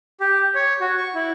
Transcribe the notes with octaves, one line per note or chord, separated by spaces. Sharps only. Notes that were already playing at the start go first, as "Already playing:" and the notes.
G4
C#5
F#4
C#6
E4